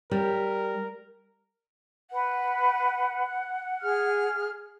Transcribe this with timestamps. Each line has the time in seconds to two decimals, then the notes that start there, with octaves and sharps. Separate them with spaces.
0.11 G3 A#4
2.11 B4 F#5
3.82 G#4 F6